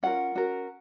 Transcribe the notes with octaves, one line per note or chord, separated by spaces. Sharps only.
C#4 F4 A#4 F#5
C#4 F#4 A#4